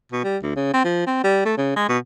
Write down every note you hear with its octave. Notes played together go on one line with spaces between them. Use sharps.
B2
G3
D2
C#3
C4
F3
C4
G3
A3
C#3
G#3
B2